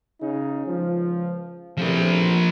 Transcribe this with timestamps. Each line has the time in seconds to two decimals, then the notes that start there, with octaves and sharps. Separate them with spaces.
0.22 C#3 D#4
0.66 C#2 F3
1.77 E2 C3 F3 A3 A#4